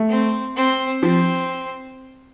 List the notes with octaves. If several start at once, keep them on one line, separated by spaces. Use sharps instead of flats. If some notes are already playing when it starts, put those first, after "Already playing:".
Already playing: A3
C4
C4
F3 C4